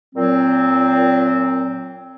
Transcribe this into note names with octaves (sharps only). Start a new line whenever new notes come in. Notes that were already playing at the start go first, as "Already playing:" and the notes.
A#2 F#3 C4